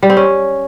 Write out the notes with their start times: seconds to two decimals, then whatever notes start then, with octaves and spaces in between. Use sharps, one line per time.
0.03 G3
0.10 C4
0.17 C#4